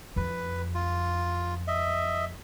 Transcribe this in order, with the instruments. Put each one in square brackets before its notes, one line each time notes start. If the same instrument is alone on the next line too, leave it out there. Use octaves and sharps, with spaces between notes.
[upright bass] F2 [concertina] B4
[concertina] F4
D#5 E5